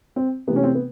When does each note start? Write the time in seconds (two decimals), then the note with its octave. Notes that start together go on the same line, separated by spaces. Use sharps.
0.16 C4
0.47 C3 E3 A3 B3
0.56 C#4
0.63 C4
0.75 B3